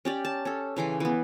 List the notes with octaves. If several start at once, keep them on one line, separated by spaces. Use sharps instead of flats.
C#4 G4 D5
A5
C#4 A4
C#3 E3 C6 D6
E3 B3